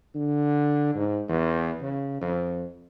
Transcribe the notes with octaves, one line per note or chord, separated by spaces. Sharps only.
D3
G#2
E2
C#3
F2